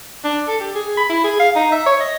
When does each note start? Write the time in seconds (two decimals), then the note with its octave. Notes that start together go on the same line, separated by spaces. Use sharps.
0.24 D4
0.48 A4
0.60 G4
0.75 G#4
0.97 B5
1.09 E4
1.24 G#4
1.39 F5
1.56 D#4
1.72 E5
1.86 C#5
2.00 D#5